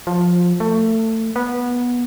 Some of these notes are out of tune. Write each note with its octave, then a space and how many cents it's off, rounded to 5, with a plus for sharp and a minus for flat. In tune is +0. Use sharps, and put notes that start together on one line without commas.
F3 +15
A3 +25
B3 -15